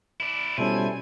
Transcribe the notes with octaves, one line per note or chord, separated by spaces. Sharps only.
E4 D5
B2 G3 C#4 E4 A4 C5 G#5